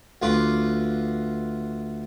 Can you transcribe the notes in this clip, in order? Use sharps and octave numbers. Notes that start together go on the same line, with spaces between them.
D2 F4 B4 D6